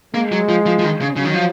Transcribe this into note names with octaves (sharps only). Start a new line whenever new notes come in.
G#3 A#3
F#3
F3
F3
F3
D#3
C#3
C#3 F#3
D#3
F3